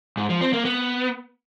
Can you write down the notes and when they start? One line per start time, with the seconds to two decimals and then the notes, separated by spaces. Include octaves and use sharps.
0.17 G#2
0.29 F3
0.41 C4
0.53 A#3
0.65 B3